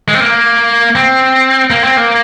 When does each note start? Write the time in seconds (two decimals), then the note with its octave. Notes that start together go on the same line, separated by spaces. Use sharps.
0.08 G#3
0.14 C4
0.20 A#3
0.95 C4
1.70 A#3
1.84 C4
1.97 A#3